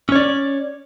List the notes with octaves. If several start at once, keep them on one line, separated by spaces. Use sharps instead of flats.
C#4 C#5 D5